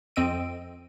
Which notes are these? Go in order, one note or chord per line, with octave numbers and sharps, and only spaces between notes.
F2 C4 D#5 E6 D7 D#7